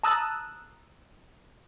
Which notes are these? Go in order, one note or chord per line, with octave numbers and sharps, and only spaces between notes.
A5 A#5 D#6 E6 F#6 A6